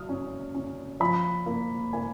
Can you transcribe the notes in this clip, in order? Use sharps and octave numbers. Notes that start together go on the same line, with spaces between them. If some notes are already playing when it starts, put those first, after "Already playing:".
Already playing: F#3 D#6 F6
C#4
C#4
F3 B5
A#3
A#3 G#5